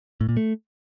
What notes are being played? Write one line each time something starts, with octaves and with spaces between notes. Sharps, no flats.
A2
A#2
A3